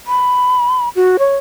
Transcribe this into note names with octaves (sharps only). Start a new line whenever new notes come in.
B5
F#4
C#5